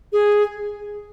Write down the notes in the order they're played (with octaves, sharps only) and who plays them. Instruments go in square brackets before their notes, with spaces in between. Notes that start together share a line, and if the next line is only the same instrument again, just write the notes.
[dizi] G#4